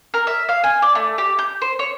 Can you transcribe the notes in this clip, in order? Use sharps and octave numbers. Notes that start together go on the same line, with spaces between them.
A#4
E5
F5
G#5
D5
A3
G4
G6
C5
C#5